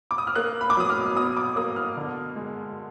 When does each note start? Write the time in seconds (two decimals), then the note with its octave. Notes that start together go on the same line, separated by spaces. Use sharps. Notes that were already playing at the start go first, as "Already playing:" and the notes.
0.11 D6
0.18 D#6
0.27 F6
0.35 A#3 F#6
0.61 B5
0.70 D6
0.77 F#3 D#6
0.90 F6
1.16 B2 D#6
1.37 D6
1.56 A#3 D#6
1.76 F6
1.97 D3
2.36 G#3